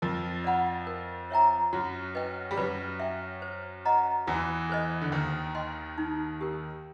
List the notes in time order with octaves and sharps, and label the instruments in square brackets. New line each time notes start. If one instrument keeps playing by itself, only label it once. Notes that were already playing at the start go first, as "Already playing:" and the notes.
[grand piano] F2 F3 [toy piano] A#4
[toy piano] D5 F#5 B5
A#4
C#5 E5 G5 A#5
[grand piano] F#2 F#3 [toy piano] F#4
[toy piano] B4 D#5 G5
[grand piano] G3
[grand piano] F#2 F#3 [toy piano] B4
[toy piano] E5 G5
C5
D#5 F#5 A#5
[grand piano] E2 E3 [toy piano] F#4
[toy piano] A4 C5 D#5
[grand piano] D3
[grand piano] D#2 D#3 [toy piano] C5
[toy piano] D#5 G5 C6
D#4
G4 A#4